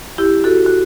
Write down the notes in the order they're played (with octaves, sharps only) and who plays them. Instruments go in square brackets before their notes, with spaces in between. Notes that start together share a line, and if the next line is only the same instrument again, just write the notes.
[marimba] E4 G4
F#4 A4
F#4